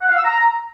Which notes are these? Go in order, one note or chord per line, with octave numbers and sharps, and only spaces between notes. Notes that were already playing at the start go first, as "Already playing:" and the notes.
F#5
F5
E6
A#5